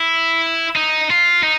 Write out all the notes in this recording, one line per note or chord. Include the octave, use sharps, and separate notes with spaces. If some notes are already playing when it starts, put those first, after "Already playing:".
Already playing: E4
D#4
F4
D#4